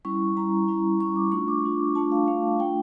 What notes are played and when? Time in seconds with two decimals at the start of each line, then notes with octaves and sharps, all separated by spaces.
0.05 G3 C#4 E4 C#6
0.37 G3 C#4 E4 A#5
0.68 G3 C#4 E4
0.99 G3 C#4 E4 C#6
1.16 D6
1.32 A3 D4 F4 C#6
1.48 D6
1.63 A3 D4 F4
1.95 A3 D4 F4 A5
2.12 F5
2.27 A3 D4 F4 F5
2.59 A3 D4 F4 G5